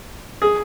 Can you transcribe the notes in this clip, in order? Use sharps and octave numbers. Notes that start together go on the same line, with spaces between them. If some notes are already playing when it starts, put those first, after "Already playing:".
G#4